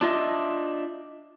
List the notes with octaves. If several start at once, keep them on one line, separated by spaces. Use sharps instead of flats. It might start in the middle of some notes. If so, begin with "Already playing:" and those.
D4 F4 D#5 E5